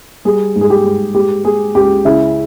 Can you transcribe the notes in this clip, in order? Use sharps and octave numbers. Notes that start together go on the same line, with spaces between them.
G3 G#4
G#2
G#4
G4
G#2
G#3 G4
G#3 G#4
C#2 G4
C#3 E4